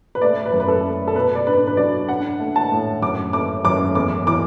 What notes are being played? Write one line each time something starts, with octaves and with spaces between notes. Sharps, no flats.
B4
A3 D5
B4
F#2
B4
A4
A3
A4
B2 B4
D5
D4 B4
B4
F#3 D5
D4 F#5
A3
A5
A2
F#2 D6
A3 D6
F#2 D6
E2 D6
E3 D6